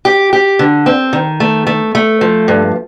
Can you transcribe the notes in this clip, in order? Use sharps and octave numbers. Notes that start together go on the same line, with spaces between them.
G4
G4
D3
C4
D#3
A3
A3
A3
F3
G2